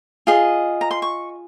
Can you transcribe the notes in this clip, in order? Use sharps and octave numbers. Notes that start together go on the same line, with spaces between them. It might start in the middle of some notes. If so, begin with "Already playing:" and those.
F4 G#4 D#5
A#5
C6
C#6